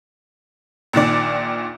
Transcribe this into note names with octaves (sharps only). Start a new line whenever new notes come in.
A#1 A#2 D#3 D5